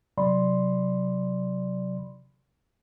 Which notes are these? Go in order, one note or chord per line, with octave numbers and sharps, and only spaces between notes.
C3 F#3 D5 B5 C6